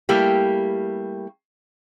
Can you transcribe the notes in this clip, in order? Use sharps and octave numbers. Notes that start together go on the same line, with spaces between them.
G3 A3 A#3 E4 G4